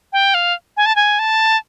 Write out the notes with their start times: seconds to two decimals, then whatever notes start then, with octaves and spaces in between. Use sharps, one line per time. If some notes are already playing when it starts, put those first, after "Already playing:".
0.13 G5
0.34 F5
0.77 G#5
0.86 A5
0.96 G#5
1.19 A5